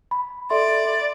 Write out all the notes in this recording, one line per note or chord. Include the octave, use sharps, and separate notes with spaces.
B5
A4 D5 E5 C6